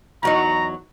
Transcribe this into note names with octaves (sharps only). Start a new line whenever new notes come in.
E2 F#3 D#4 A#5